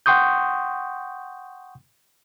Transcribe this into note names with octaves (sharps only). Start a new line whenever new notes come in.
F#5 G5 C6 C#6 D#6 G6